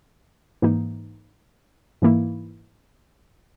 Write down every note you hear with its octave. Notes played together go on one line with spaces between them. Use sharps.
G#2 E3 A#3 D#4
G#2 E3 A#3 E4